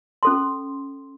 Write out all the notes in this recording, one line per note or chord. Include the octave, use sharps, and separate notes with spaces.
C#4 A4 C6